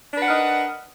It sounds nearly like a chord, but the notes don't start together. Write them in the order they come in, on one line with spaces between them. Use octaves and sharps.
D4 B4 F#5 A#4 D#5